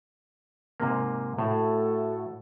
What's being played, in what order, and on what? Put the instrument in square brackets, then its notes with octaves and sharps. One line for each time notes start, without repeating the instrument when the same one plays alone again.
[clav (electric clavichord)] G#2 C3 A#3
[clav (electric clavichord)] A2 [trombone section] A3 F#4 A4